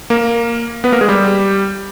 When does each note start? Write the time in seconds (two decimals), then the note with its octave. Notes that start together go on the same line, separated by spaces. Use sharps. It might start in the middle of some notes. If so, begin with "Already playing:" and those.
0.10 A#3 A#4
0.84 B3 B4
0.92 A#3 A#4
1.01 G#3 G#4
1.08 G3 G4